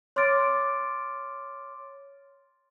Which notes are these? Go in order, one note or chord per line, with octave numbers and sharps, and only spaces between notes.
C#5 C6 D6 F6 A6 D7